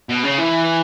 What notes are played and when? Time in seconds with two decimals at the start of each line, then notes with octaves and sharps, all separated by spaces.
0.09 B2
0.23 C#3
0.38 E3